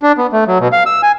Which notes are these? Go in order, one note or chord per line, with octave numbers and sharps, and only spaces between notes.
D4
B3
A3
F#3
B2
F5
E6
G#5